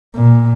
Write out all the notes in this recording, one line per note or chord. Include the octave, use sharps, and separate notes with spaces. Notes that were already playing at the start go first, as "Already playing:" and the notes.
A#2